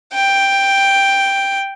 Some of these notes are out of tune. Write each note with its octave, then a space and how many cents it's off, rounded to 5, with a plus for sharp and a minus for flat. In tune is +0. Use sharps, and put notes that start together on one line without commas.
G5 +5